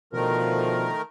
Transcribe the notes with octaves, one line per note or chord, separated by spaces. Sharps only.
B2 D3 D#3 F3 A3 A#4